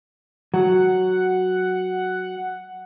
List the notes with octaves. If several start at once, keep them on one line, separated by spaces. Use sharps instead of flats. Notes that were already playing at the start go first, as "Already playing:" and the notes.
F#3 F#5